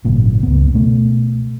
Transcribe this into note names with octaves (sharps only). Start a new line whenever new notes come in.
G#1 F#2 A#2 C#3
C#2 B3
B2 A3